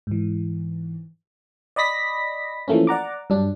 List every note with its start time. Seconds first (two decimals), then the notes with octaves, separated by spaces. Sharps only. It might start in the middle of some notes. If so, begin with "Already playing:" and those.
0.07 G#2 E3
1.76 D5 D#5 B5 A#6 B6
2.68 E3 F3 A3 A#3 C#4
2.87 D5 F#5 A#5 D6
3.30 G2 F#3 D4